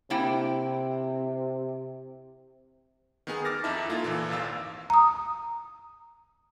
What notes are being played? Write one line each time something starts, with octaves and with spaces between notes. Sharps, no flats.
C3 A#3 E4 G5
D#3 B3 G#4
D6 E6 F6 A6 A#6
F2 D#4 E4 E5 A5
A#3 E4 F4 A4
A#2 E3
G#1 D#2 F5 E6
A#5 D#6